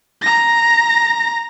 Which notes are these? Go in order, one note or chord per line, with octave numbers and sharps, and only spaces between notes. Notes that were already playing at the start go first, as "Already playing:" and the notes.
A#5 A#6